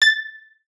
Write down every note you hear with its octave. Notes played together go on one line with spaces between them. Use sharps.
A6